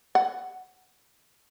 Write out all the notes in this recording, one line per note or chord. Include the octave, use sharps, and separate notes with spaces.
F#5